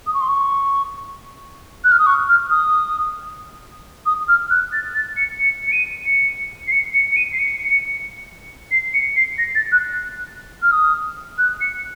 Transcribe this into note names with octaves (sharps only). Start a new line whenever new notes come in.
D#6
C#6
C6
C#6
F#6
F6
D#6
C#6
F6
D#6
D#6
F6
F#6
A6
A6
C#7
C#7
C#7
D#7
C#7
C7
C#7
C#7
C#7
D#7
C7
C#7
C7
C#7
C7
A#6
A6
F#6
F6
D#6
F#6
C#7